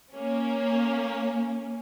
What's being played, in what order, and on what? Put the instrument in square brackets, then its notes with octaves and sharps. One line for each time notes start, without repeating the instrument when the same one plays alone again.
[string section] A#3 C#4